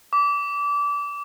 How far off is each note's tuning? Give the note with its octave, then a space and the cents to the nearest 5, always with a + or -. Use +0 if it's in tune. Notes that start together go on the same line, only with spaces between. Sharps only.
D6 -25